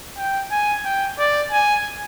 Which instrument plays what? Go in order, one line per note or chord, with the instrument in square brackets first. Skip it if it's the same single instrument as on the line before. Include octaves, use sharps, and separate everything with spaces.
[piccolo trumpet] G5
G#5
G5
D5
G#5